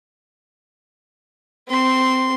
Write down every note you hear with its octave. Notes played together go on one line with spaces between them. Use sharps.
C4 C6